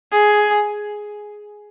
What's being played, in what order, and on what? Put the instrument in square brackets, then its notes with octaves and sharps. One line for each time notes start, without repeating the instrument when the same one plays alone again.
[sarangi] G#4